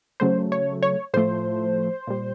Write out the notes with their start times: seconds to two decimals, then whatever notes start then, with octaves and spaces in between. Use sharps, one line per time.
0.20 C#3 F#3 A3 C5
0.52 C#5
0.83 C#5
1.13 A2 F3 A3 C5
2.07 A#2 G3